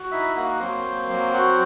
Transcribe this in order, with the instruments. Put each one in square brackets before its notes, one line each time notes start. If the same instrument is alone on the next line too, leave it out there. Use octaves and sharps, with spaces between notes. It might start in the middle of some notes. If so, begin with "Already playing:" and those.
Already playing: [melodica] F#4
D#4 E4 E5
A#3 F#4 F#5
F#3 C4 C5
A#3
F#3
F#4